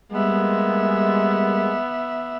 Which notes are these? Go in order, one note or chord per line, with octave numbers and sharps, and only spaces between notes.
G3 G#3 A#3 B3 E5